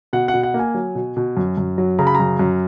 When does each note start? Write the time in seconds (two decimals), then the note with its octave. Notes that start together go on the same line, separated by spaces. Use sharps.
0.13 B2 F#5
0.28 F#5
0.34 B2
0.43 F#5
0.54 A#3
0.59 G#5
0.74 F#3
0.95 B2
1.17 B2
1.37 F#2
1.57 F#2
1.78 F#3
1.99 C#3 A#5
2.07 B5
2.15 A#5
2.20 F#2
2.39 F#2